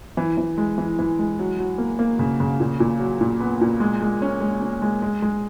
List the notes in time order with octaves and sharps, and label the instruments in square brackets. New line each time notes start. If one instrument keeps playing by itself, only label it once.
[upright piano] E3
E3
G#3
E3
E3
G#3
F#3
F#3
A#3
A#3
C#3
C#3
A#2
A#2
F#3
A#2
B3
A#2
G#3
G#3
C#4
G#3
C#4
G#3
G#3
G#3